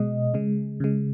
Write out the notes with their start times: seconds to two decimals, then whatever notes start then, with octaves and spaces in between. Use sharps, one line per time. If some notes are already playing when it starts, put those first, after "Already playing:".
Already playing: B2 G#3 D#5
0.34 C#3 G#3
0.80 C#3 G#3